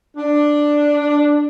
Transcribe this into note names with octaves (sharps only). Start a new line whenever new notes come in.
D4